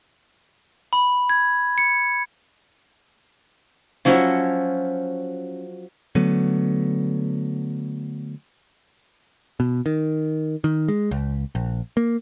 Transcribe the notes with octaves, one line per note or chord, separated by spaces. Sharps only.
B5
G#6
C#7
F3 F#3 C#4 E4
D3 F#3 A3 B3
B2
D#3
D#3
G#3
C#2
A#1
A#3